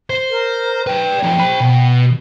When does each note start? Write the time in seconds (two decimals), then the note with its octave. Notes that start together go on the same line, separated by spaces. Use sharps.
0.10 C5
0.30 A#4
0.87 B4 D5 G5
1.23 F3 D#4
1.38 C5 B5
1.60 B2